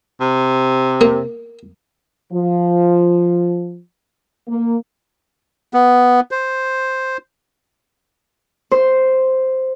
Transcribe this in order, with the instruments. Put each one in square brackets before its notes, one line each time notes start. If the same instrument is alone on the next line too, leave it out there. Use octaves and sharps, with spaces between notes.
[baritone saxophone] C3
[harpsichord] A#3
[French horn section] F3
A#3
[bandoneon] B3
C5
[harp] C5